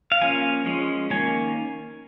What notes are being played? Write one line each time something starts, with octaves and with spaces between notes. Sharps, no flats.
F5
F3 A#3 C#4 G#5
F3 G#3 C#4
D#3 A#3 C#4 G#5